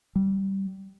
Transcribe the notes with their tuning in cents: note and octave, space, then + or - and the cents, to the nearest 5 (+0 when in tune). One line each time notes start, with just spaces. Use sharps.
G3 -15